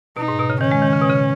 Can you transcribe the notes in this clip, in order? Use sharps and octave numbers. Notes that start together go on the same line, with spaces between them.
B2 D#4
G#2
B2
C#3
D#3 C#4
G#3
D#3
C#3
B2
C#3